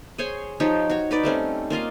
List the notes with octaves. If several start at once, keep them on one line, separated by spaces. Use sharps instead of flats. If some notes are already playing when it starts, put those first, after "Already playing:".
G#4 C5 C#5 G#5
F3 D#4 G4 C#5
F#4 C#5
D#4 B4 D5
G3 A3 C4 C#4
A#3 F4 D#5 F5